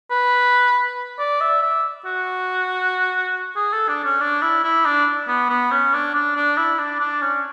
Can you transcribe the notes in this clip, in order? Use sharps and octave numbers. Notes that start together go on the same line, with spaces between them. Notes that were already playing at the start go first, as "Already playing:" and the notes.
B4
D5
E5
E5
F#4
G#4
A4
D4
C#4
D4
E4
E4
D4
B3
B3
C#4
D4
D4
D4
E4
D4
D4
C#4